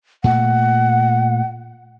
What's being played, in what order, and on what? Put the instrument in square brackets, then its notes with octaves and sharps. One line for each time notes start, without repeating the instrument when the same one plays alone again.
[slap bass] A#2 A3 [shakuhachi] F#5